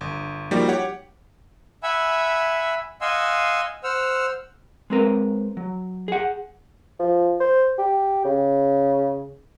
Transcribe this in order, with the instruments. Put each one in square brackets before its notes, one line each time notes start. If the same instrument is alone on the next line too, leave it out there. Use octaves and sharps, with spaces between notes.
[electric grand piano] G1
F3 G3 A#3 D#4 F#4 G4
G4 C#5 F#5
[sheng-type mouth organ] E5 F#5 G#5 B5 E6
D#5 F5 F#5 G#5 C6 E6
C5 F#5 E6 F6
[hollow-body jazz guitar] G#3 C4 A#4 B4
F#3
G#4 F#5
[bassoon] F3
C5
G4
C#3